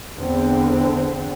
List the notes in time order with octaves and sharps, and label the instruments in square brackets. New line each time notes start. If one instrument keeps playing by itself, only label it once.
[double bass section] E2 D3 C4